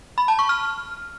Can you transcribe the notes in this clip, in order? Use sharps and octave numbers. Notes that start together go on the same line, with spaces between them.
B5
A5
C#6
F6